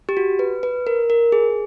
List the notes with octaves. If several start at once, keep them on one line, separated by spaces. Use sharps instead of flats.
G4
F#4
B4
B4
A#4
A#4
G#4